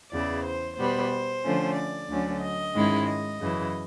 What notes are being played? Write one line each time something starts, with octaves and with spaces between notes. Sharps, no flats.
E2 C#3 E3 D5
C5
B2 G3 B3 C5
D3 F3 A3 C#4
D5
D2 D3 F#3 A3 C#4
D#5
G#2 D#3 G#3 C#4 E4
D#5
F#2 C#3 E3